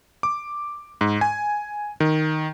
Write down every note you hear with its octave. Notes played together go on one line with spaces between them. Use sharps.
D6
G#2
G#5
D#3